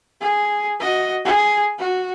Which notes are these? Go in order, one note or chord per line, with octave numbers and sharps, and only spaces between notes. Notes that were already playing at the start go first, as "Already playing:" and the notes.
G#4
F#4 D#5
G#4
F#4